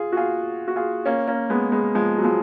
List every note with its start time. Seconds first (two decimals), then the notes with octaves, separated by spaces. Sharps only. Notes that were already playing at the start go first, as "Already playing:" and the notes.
Already playing: F4 G#4
0.12 F#4
0.17 F4 G#4
0.68 F#4
0.76 F4 G#4
1.05 A#3 C#4
1.27 A#3 C#4
1.50 G#3 B3
1.72 G#3 B3
1.95 F3 G#3
2.18 F#3
2.24 F3 G#3